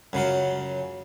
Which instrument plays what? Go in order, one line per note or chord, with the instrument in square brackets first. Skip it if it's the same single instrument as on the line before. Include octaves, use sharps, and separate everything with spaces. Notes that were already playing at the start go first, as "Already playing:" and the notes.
[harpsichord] F#2 C#3 F#3 F4